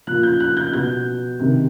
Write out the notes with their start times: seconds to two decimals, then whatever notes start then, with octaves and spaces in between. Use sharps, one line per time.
0.07 A#2 F3 F#6
0.23 G6
0.40 F#6
0.57 G6
0.73 B2 G6
1.39 C3 D#3